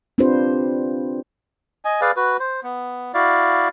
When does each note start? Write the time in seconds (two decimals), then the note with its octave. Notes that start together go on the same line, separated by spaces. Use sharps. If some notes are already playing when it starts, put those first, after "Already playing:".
0.18 C4 D4 F4 G4 B4 C5
1.85 D#5 G#5
2.01 G#4 B4 D5 F5
2.16 F#4 B4
2.40 C5
2.63 B3
3.14 E4 F#4 D5 F5